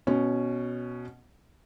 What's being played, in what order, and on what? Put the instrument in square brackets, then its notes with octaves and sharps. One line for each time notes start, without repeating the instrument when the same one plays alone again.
[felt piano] B2 C#4